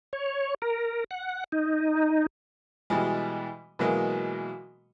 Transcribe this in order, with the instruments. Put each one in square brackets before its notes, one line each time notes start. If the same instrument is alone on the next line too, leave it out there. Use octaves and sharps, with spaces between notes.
[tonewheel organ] C#5
A#4
F#5
D#4
[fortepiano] B2 E3 G3 G#3
B2 E3 F#3 G#3 A#3